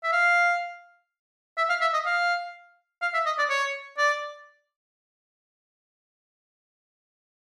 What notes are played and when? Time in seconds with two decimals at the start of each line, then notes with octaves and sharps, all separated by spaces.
0.03 E5
0.12 F5
1.57 E5
1.69 F5
1.81 E5
1.94 D#5
2.06 F5
3.02 F5
3.14 E5
3.26 D#5
3.38 D5
3.50 C#5
3.98 D5